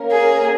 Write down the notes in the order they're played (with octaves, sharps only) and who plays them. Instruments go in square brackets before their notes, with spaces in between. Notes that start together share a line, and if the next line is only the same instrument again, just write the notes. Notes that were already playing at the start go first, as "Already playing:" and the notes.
Already playing: [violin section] A#3 C#4 A#4
[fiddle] G#4